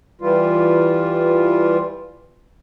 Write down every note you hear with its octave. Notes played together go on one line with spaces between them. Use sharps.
E3 G3 F4